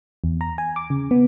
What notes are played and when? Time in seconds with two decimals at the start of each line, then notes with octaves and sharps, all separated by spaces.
0.24 E2
0.41 A#5
0.58 G#5
0.76 D6
0.90 C#3
1.11 B3